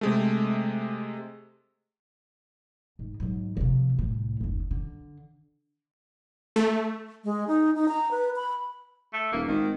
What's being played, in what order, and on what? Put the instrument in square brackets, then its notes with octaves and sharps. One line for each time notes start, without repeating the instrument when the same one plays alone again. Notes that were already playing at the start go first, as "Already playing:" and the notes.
[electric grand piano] C3 G#3 A3
[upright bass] G#2
G#2 F#3
C3 F3
C2 A2
F#1 D#2
D3
[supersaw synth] A3
[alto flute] G#3
D#4
D#4
A#5
B4
B5
[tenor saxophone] A3
[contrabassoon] D#1 [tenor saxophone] A#3
[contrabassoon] G#1 [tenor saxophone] D#3